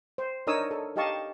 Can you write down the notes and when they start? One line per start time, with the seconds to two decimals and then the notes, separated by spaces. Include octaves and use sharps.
0.18 C5
0.47 D4 D#4 A#4 C#5 D#6 E6
0.71 A4
0.96 D#4 G4 D#5 F5 A5 C#6